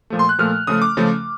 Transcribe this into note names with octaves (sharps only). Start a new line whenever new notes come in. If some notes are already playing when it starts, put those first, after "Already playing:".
A#2 F3 A3
C6
F#6
A#2 F3 A3 F6
C#3 F3 A3 D#6
D6
C#3 F3 A3